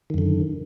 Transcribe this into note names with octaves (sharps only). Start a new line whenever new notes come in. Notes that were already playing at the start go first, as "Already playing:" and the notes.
F#2 D3 D#3